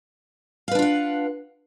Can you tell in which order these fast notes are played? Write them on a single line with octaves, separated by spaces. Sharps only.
F5 B4 D4 F4 F#5